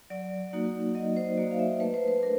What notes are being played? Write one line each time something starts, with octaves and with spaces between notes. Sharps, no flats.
F#3 D5
A#3 D#4 F#4
F#3 D#5
C5
A#3 D#4 F#4 D5
F5
E5
A3 B4
C5
B4
D4 A#4